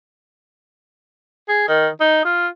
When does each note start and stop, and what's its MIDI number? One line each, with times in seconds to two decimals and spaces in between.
1.48 1.66 68
1.68 1.88 51
2.00 2.24 63
2.25 2.47 65